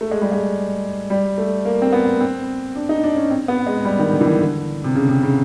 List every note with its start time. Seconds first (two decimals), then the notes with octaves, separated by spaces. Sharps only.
0.01 A3
0.11 G#3
0.21 G3
0.32 G#3
1.10 G3
1.38 A3
1.65 A#3
1.82 C4
1.93 B3
2.21 C4
2.75 D4
2.89 D#4
3.03 D4
3.16 C#4
3.31 C4
3.48 B3
3.67 G#3
3.85 G3
3.99 D#3
4.12 D3
4.21 E3
4.26 D#3
4.40 D3
4.84 C3
4.96 C#3
5.09 C3
5.22 C#3